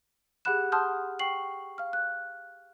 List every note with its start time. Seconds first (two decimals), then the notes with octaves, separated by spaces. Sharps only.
0.45 G4 G#4 F#5 B5 F#6 E7
0.72 F#5 A5 C6 D#6 F6 G6
1.19 G5 C#6 C7 F#7
1.78 F5 F6
1.93 F#6